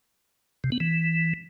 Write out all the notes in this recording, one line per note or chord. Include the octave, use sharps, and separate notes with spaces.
C3
B3
E3